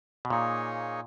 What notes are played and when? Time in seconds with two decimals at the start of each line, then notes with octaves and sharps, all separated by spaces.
0.25 B2
0.30 A#2 A#3 D#4 G#4 C#5